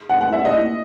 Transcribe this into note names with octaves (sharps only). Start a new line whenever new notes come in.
F#5
F#5
E5
D#5